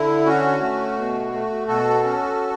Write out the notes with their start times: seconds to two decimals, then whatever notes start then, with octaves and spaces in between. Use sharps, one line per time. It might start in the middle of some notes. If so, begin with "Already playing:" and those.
Already playing: D3 E4
0.26 C#4 F#4
0.61 A3
0.96 B2
1.32 A3
1.68 B2 F#4 A4
2.03 C#4